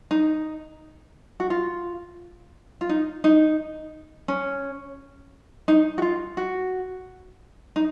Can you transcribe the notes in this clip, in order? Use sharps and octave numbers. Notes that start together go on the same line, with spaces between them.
D#4
F#4
F4
F4
D#4
D#4
C#4
D#4
F#4
F4
F#4
D#4